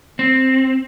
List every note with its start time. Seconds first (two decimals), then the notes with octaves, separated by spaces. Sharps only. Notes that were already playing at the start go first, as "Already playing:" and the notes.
0.19 C4